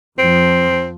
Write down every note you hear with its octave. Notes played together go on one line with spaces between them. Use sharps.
F2 F3 C4